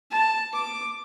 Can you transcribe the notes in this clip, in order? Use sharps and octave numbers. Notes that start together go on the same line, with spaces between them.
A5
D6